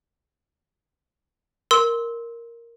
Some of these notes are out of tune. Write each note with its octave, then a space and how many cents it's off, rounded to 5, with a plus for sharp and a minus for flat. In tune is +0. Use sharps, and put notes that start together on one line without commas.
A#4 +0 C6 +0 E6 -25